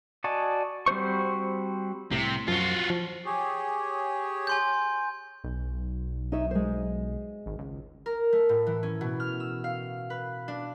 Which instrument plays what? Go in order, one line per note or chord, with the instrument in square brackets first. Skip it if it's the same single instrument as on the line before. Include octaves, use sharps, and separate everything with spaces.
[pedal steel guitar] F#4 D5 D#5 G#5 A5
G3 C4 F#4 C5 C#6
[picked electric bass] C2 A2 [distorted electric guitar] C3
[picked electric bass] F#2 F3 [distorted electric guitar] F4 F#4
[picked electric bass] F3
[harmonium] G4 G#4 C#5
[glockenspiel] G#5 C6 G6
[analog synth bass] B1
[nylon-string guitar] D#4 C#5 E5
G#3 C5
[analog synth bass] G#1
C#2
[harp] A#4
A3
A2
E3
C#4
B2
F6
E6
F5
B4
D4